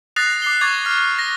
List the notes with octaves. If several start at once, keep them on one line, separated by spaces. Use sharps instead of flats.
D#6 F#6 A6 A#6 C7 F7
D6 C7 G7
C#6 D6 G#6 A6 F7
F6 B6 C7
G#6 C7
A#6